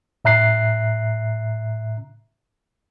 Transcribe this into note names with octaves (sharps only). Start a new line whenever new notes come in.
A2 E5 A#5 F#6 C7